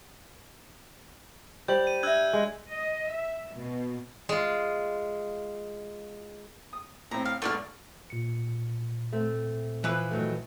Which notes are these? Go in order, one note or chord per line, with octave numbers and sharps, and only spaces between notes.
G3 C5 G6 F#7
D#7
D4 E5 E6 F#6 G#6
G#3
D#5
E5
B2
G#3 F4
D#6
A2 C4 A#5
F5
B1 G#2 A3 D5 F6
A#2 C#7
A3 C4
E3 F3 B4
D#3 F#3 A3